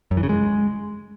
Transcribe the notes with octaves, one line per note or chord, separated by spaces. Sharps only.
F#2
E3
C#3
G#3